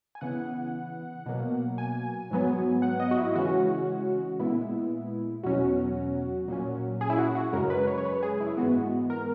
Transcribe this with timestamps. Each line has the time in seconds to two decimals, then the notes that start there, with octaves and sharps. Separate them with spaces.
0.15 G#5
0.21 C#3 E3 B3 F#5
1.26 B2 F#3 A#3
1.78 G#5
2.31 G#2 F#3 B3
2.82 F#5
3.00 D#5
3.11 F#4
3.18 E4
3.35 C#3 E3 G#3 C#4 F#4
4.39 A#2 G#3 B3 E4
5.43 E2 B2 F#3 C#4 F#4
6.48 A#2 F#3 C#4
7.01 G#4
7.10 E4
7.18 F#4
7.35 F#4
7.53 F#2 C#3 G#3 C#4 A#4
7.70 B4
7.87 C#5
7.98 C#5
8.05 B4
8.23 G#4
8.40 E4
8.57 G#2 E3 G#3 B3 F#4
9.10 A#4